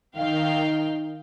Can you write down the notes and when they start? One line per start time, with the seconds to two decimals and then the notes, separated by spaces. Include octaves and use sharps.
0.16 D#3 D#4 F5 G5